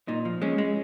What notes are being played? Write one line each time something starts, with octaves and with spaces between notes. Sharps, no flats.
A#2 D#4
F3
G#3 C#4
G#3